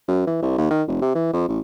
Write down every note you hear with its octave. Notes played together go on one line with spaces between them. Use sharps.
F#2
E3
C2
D#2
D#3
F1
C3
E3
F2
A1